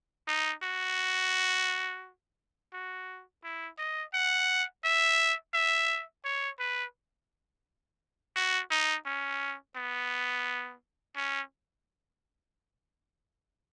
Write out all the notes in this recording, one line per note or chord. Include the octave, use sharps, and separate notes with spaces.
D#4
F#4
F#4
E4
D#5
F#5
E5
E5
C#5
B4
F#4
D#4
C#4
B3
C#4